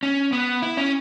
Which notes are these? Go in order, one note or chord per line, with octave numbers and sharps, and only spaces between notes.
C#4
B3
E4
C#4